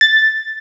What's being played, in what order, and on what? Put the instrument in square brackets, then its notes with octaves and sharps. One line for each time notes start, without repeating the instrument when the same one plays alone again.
[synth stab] A6